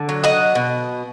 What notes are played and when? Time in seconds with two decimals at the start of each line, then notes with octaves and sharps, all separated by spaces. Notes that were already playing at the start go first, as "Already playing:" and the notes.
Already playing: D3
0.09 F#3
0.24 D#5 F#5
0.55 B2